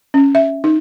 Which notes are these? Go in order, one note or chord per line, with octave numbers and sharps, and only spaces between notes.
C#4
E5
D#4